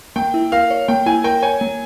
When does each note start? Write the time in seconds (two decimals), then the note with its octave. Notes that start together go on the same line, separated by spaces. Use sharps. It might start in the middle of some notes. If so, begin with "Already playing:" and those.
0.16 A#3 G5
0.34 E4
0.52 A#4 F5
0.71 C#5
0.88 A#3 G5
1.06 E4 G#5
1.24 A#4 G5
1.42 C#5 G#5
1.61 A#3